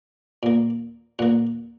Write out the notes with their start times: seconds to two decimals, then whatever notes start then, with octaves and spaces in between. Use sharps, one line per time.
0.43 A#2 A#3
1.19 A#2 A#3 F#5